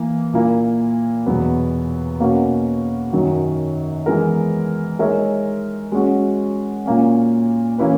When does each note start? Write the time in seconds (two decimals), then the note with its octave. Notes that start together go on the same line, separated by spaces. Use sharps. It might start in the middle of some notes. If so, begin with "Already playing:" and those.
Already playing: E3 A#3
0.34 A#2 A#3 E4
1.26 E2 B2 F#3 B3
2.20 B2 A#3 C#4 F#4
3.13 F#2 D#3 F#3 C#4
4.06 E3 G#3 B3 E4 A#4
4.99 G#3 D#4 A#4 C#5 E5
5.92 G#3 C#4 F#4
6.86 A#2 A#3 C#4
7.78 E3 A#3 C#4 E4 B4